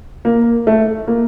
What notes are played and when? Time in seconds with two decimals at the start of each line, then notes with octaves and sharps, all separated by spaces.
0.25 A#3
0.67 A3
1.08 A#3